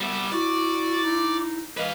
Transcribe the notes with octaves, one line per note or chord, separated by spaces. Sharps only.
G3 B3 E5
E4 F#4 D5
D#4
E3 B4 D#5 F5